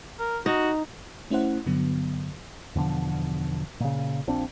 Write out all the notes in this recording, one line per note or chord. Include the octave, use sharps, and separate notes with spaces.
A#4
D#4 F#4
A3 C#4 E4 C5 F#5
G2 D3 F#3 B3
E2 B2 D3 F3
A#2 C#3
A#1 A#2 C4 D4